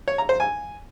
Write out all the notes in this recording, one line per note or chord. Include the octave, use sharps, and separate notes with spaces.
C#5
A#5
C5
G#5